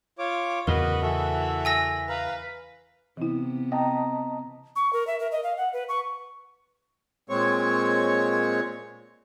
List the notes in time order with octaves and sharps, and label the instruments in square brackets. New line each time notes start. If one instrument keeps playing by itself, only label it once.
[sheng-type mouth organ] F4 C#5 D6
[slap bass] E2 A2 C#3 [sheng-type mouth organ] F#4 B4 D#5 [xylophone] A#4
[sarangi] E3 [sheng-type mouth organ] F#4 A4 E5
[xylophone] G#5 E6 A#6
[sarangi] B4 [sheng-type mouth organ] F5 A#5
[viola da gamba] C3 B3 [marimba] E3 E4
[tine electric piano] D#5 A5 A#5 [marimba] G5
[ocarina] C#6
A#4
E5
A#4
D#5
F5
F#5
B4
C#6
[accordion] A#2 G#3 C4 C#5 C#6